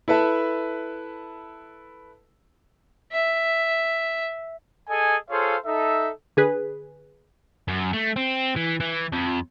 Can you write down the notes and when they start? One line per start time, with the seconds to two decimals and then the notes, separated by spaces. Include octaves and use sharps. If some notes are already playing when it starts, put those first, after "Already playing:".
0.08 E4 A4 B4 E5 A5
3.12 E5
4.89 G#4 A4 D#5 G#5
5.30 F4 G#4 A4 C5 C#5 F5
5.66 D#4 A4 E5
6.37 D3 G#4 B4
7.68 F#2
7.93 A3
8.16 C4
8.56 E3
8.80 E3
9.12 F2